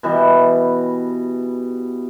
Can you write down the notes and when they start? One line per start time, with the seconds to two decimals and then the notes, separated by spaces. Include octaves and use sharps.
0.03 B2 E3 G3